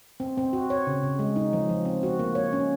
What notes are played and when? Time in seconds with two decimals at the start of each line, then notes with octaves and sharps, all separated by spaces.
0.20 C4
0.38 C4
0.53 F#4
0.70 C#5
0.87 C#3
1.03 C#3
1.19 G#3
1.36 D#4
1.53 F3
1.69 F3
1.85 C4
2.03 F#4
2.19 A#3
2.35 C#5
2.53 C#4